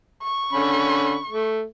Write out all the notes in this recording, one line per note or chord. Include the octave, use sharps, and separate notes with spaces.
C#6
D3 C#4 B5
A3